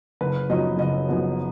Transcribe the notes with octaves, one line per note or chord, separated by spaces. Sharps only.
F#1 B4
F#2 F3 B3 D#4 D#5
F#1 D#5
F#2 F3 B3 D#4